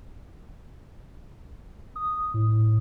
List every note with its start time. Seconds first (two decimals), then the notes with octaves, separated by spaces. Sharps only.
1.96 D#6
2.34 A2